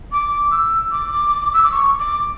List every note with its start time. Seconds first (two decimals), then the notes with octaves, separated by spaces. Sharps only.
0.12 D6
0.51 E6
0.91 D6
1.53 E6
1.63 D6
1.72 C#6
1.99 D6